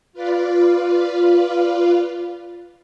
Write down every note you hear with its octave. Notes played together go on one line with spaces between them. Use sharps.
F4 B4 D5 F5